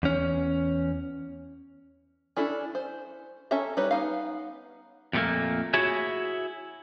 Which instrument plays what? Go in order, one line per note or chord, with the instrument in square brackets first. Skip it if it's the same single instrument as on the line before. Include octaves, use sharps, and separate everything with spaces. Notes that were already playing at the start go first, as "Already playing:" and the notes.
[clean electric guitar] E2 C#4
[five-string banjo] C#4 D4 E4 A4
C5
C#4 A4 C#5 E5 A#5
G3 D#4 B4 C#5
B3 D#4 F5
[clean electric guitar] F2 A#2 G3 A3 A#3
E4 F#4 G#4 C#5 E5